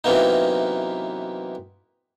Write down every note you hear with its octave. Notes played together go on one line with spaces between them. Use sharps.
F#2 C3 E3 A#3 B3 D#4